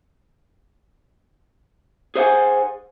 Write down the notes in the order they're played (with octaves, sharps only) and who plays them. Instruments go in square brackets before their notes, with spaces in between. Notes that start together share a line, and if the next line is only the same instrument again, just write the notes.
[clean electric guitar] G#4 C5 D#5 E5 F#5 G#5